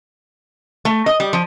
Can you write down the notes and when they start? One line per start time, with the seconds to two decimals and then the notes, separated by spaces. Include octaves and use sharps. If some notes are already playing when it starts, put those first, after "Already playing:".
0.85 A3
1.06 D#5
1.20 G3
1.33 F3